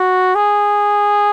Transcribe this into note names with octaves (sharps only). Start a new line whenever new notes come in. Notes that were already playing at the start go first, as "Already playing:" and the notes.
Already playing: F#4
G#4